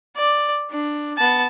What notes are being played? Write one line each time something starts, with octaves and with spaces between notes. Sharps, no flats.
D5
D4
B3 A5